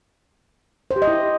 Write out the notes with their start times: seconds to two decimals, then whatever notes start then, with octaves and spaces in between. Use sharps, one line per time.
0.91 C5
0.96 G4
1.02 D#5
1.07 E4